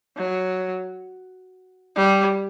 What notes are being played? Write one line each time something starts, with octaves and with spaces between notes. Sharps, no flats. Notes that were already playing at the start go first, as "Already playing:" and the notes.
F#3
G3